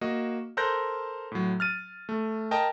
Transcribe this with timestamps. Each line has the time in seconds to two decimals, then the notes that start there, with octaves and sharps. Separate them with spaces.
0.01 A#3 F#4 D#5
0.57 A4 A#4 C5 F#6 G6 A#6
1.32 A2 F#3
1.60 F6 A6 D#7
2.09 A3
2.51 A#4 D#5 G5 A5